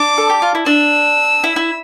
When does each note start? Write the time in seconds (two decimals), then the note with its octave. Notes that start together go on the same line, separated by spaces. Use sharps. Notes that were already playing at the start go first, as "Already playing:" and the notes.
Already playing: D4 D6
0.18 A4
0.30 G4
0.42 F4
0.55 E4
0.66 D4 E6
1.44 E4
1.56 E4